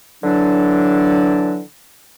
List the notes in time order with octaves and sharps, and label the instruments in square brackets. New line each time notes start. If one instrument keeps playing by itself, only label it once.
[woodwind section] D3 E3 F#3 D4